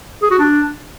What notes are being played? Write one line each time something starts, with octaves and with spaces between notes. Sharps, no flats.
G#4
F#4
D4